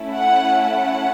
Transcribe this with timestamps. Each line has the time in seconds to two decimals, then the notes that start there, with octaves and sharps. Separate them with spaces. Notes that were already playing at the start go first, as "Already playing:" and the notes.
Already playing: A3 C#4 E4
0.14 F#5
0.64 F#5